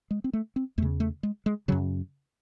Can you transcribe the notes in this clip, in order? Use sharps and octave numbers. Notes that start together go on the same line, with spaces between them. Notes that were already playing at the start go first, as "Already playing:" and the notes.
G#3
C4
A3
C4
E2 C#3 A3
A3
G#3
G#3
F#2 C#3 F#3